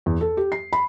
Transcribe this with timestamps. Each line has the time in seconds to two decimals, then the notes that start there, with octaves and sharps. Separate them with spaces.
0.06 E2
0.21 A4
0.37 G4
0.52 C7
0.73 B5